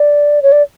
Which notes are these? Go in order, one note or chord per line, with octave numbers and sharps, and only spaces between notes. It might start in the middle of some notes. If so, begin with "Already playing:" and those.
Already playing: D5
C#5
D5